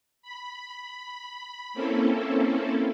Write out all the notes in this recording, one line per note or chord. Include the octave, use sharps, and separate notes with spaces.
B5
A#3 C4 C#4 E4 A4